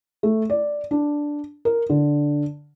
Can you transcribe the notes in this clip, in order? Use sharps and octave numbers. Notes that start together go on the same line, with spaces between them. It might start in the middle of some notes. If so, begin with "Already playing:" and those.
A3
D5
D4
A#4
D3